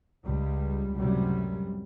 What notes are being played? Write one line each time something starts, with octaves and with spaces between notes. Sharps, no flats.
C#2 G3
C#2 F#2 A2 C3 F#3 G3